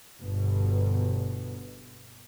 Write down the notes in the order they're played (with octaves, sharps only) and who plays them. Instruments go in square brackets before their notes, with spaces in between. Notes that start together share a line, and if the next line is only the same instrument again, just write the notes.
[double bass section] G1 B2